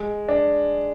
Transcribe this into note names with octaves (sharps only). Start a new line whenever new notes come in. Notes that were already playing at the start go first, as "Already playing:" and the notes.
Already playing: G#3
D4